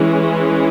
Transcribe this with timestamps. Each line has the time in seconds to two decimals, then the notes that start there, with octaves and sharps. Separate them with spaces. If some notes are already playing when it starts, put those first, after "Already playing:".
Already playing: E3 G#3 C#4